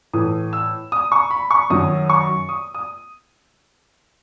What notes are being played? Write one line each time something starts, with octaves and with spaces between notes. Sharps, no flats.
A2 E3 D#6
E6
D#6
C#6
B5
C#6
F#2 D#3 F#3 D#6
C#6
D#6
D#6